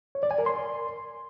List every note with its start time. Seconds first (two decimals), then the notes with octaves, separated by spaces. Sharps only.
0.15 C#5
0.23 D5
0.31 G#5
0.38 A#4
0.46 C6